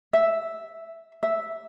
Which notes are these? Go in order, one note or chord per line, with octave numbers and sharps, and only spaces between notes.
E5
E5